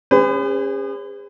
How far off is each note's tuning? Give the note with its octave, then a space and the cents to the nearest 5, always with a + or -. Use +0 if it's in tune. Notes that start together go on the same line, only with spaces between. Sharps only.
C#4 -5 G#4 -40 B4 +40